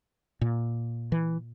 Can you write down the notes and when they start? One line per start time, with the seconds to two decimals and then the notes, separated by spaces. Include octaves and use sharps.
0.41 A#2
1.12 E3